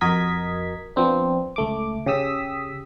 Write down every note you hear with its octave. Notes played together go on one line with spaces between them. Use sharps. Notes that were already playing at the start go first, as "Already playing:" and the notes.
F2 F#4 A#4 D#5 G#6 B6
F3 B3 C4 D4
C#2 A3 D6
C#3 G4 D#6 E6 B6